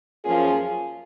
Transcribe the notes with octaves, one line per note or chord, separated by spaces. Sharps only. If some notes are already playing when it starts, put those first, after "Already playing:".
F#2 F3 A#3 C#4 F4 G#4